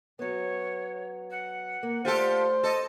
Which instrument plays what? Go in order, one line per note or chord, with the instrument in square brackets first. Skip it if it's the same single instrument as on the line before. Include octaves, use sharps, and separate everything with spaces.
[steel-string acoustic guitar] F#3 B3 [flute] C#5
[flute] F#5
[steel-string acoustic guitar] A#3
[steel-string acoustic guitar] A3 D5 [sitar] F4 G4 A4 [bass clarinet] C5
[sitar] A4 [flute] D#5